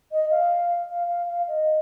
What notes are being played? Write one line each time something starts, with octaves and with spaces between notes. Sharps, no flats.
D#5
F5
F5
F5
F5
D#5